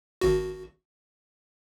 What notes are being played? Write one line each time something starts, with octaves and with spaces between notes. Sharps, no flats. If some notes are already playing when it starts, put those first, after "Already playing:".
G#1 F#4